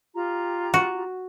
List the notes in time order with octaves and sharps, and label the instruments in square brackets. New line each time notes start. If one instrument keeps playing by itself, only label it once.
[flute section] F4 G4 A#5
[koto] F#4